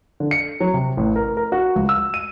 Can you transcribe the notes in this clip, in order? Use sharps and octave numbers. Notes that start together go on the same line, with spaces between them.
D3
C#7
F#3
C3
A1
A#4
A#4
F#4
C#2
E6
D#7